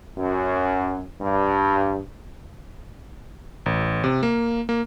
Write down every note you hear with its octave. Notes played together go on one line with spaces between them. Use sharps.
F#2
G2
A1
C3
A#3
A#3